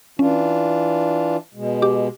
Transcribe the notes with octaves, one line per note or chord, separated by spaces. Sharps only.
E3 C#4 D4 F4
B2 G#3
G4 D6